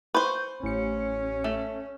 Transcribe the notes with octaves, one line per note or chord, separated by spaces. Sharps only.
B4 C5 C#6 G6
A1 C#4 C#7
A3